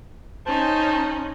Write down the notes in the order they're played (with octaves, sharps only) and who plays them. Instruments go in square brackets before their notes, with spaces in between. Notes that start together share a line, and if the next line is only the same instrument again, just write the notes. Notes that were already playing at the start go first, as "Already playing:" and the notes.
[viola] C#4 D#4 [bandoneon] C5 A5